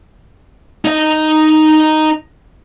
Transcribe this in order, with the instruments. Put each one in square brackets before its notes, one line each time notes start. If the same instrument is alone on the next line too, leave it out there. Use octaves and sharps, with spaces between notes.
[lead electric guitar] D#4 D#5